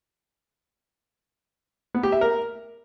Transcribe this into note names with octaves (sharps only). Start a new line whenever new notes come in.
B3
G4
E5
A#4